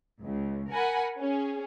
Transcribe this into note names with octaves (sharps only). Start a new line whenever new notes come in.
C#2
A#4 F#5 G#5 B5
C#4 G#4